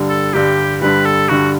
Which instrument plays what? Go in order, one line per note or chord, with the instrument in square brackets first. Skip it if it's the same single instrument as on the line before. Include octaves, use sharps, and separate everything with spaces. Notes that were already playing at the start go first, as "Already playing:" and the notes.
Already playing: [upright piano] G2 D3 G3
[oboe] A4
[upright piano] G2 D3 G3 [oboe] G4
[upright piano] G2 D3 G3 [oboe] B4
[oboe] A4
[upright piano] G2 D3 G3 [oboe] F#4